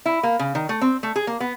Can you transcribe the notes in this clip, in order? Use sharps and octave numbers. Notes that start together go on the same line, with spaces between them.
E4
A#3
C#3
D#3
A3
C4
A3
G#4
A#3
B3